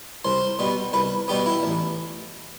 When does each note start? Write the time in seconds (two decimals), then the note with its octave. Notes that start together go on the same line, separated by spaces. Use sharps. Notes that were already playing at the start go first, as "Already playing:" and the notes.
0.25 C2 C5
0.59 B2 G3 B3
0.93 C2 B4
1.28 B2 G3 B3 G4
1.46 E4
1.63 A1